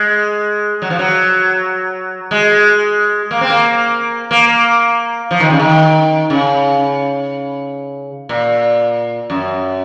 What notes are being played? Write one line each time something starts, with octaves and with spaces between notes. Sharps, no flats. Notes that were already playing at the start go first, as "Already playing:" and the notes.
Already playing: G#3
F#3
F3
F#3
G#3
A#3
C4
A#3
A#3
F3
D#3
C#3
D#3
C#3
A#2
F#2